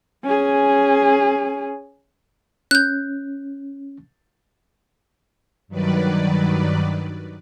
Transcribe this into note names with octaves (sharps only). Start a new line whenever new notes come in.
C#4 G#4
C#4 F#6 G6
G2 D#3 F#3 B4 D5